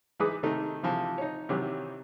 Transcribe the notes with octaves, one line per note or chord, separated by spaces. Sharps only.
E3 G#3 D#4 B4 D6 D#6
C3 D#3 A3 D#4
C3 E3 F3
D#4 C#5
C3 D#3 E3 F#3 G4